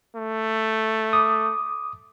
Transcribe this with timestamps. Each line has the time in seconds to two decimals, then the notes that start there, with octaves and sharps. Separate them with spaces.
0.16 A3
1.13 D6 D#6